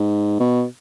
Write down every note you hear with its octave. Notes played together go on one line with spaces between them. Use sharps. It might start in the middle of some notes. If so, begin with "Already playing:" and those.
Already playing: G#2
B2